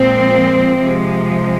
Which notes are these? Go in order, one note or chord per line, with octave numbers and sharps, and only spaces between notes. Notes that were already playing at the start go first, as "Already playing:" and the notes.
Already playing: A#2 F3 G#3 C4
C3 F3 G#3